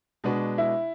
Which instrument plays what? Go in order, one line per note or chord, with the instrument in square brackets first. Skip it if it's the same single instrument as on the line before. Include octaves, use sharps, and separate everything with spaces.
[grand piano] B2 G#3 D4 F#4 B4
[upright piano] E4